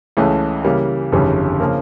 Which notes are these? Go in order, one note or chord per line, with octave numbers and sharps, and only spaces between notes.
C#2 C#3 E3 A3
C#3 E3 G3 A#3
G1 F2 C#3 E3 G3
C#3 F3 A#3